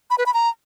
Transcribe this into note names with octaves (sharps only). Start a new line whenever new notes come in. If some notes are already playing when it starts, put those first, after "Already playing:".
B5
B4
B5
A#5